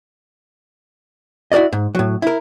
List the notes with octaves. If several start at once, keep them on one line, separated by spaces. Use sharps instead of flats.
E4 F#4 A#4 D5 D#5
G#2
A2 F#3
E4 A#4